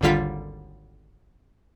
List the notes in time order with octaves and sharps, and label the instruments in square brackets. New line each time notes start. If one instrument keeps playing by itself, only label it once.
[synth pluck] G#1 D#2 D3 G3 F4 B6